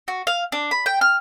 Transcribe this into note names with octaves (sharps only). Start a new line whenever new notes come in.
F#4
F5
D4
B5
G5
F6